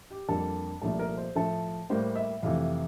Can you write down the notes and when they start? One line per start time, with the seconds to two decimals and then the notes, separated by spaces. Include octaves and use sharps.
0.11 G4
0.28 F2 D3 G3 A#3 A4
0.82 C2 A#2 F3 A3 A4
0.99 A#4
1.18 C5
1.35 A2 F3 A3 A4
1.90 A2 G3 A#3 C5
2.16 E5
2.43 F2 C3 E3 A3 F5